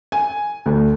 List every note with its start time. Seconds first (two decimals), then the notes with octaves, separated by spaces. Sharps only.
0.12 G#5
0.66 D2